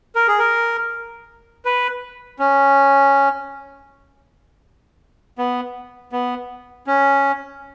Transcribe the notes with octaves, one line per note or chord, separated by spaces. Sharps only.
A#4
G#4
A#4
B4
C#4
B3
B3
C#4